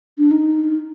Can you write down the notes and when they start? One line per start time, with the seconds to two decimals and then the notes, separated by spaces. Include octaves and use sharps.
0.18 D4
0.31 D#4